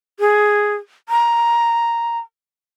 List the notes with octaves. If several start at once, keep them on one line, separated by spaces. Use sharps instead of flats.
G#4
A#5